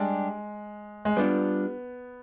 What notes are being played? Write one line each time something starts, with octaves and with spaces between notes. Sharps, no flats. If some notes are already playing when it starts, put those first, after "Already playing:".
Already playing: G3 G#3 D4 G4
G#3
G3 B3 D4 F4